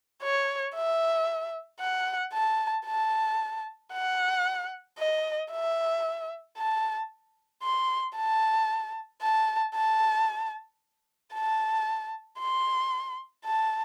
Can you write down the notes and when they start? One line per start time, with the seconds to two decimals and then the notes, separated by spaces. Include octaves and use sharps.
0.22 C#5
0.75 E5
1.80 F#5
2.33 A5
2.86 A5
3.92 F#5
4.98 D#5
5.51 E5
6.57 A5
7.63 C6
8.16 A5
9.22 A5
9.74 A5
11.33 A5
12.39 C6
13.45 A5